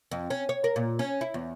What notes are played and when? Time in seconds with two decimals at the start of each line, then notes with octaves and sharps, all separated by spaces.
0.11 F2
0.30 C#4
0.49 C#5
0.64 A#4
0.76 A#2
0.99 C#4
1.21 E4
1.34 E2